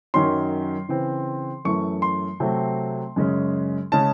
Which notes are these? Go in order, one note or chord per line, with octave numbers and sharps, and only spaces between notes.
F#2 D#3 F#3 C#4 C6
C#3 E3 C4
F#2 E3 A3 C#4 C#6
C6
C3 F#3 A3 C4
F#2 C#3 G#3 C#4
C#3 G#3 C#4 A5